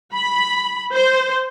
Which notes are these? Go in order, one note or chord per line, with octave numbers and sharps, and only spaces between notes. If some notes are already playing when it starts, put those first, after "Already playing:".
B5
C5